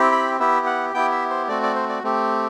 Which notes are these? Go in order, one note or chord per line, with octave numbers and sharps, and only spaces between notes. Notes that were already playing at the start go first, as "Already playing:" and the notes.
Already playing: C4 E4 G4
B5
B3 E4 G4 E5
F#5
B3 E4 G4 G5
E5
C5
A3 C4 F#4 D5
D5
C5
D5
A3 C4 G4